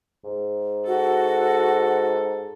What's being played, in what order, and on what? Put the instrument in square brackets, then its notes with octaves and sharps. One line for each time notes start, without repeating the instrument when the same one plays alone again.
[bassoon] G#2
[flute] F#4 [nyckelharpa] A4